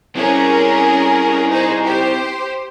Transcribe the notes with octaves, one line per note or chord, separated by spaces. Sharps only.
C4 C#4 E4 G#4 A#4
D#4 G#4 C5
G4 C5